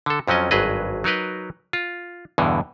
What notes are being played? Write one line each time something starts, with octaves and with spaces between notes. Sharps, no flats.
D3 A4
F2 F3 F#3 C#4 D#5
G#1 G2 F#3 G#4 B4 D#5
F#3 D#4 A#4 B4 D#5
F4
E2 G2 B2 D3 E3